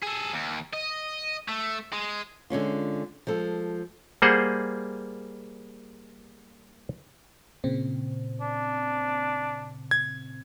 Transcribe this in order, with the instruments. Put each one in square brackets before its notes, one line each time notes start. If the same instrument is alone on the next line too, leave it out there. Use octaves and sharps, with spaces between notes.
[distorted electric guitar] G#4 A4
D#2
D#5
A3
G#3
[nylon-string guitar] D3 G#3 C#4 F4
F3 G#3 A4
[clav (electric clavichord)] G3 A#3 G#4 C5 F#5
[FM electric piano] A#2 C#3 C4
[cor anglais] D4
[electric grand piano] G#6